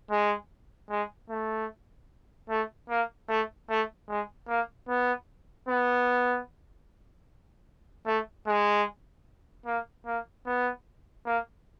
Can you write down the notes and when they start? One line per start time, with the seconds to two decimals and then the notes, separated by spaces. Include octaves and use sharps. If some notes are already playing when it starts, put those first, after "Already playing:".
0.11 G#3
0.90 G#3
1.30 A3
2.50 A3
2.90 A#3
3.29 A3
3.70 A3
4.09 G#3
4.49 A#3
4.88 B3
5.69 B3
8.07 A3
8.47 G#3
9.66 A#3
10.06 A#3
10.47 B3
11.26 A#3